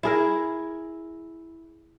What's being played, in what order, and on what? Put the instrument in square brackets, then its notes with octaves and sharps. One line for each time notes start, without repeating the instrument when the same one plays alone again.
[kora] E4 G#4 A#4